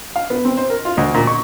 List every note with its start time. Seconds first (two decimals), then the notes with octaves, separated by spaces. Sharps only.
0.16 F5
0.30 B3
0.45 C4
0.57 C5
0.70 A#4
0.85 F4
0.97 D2
1.14 A#2
1.27 C#6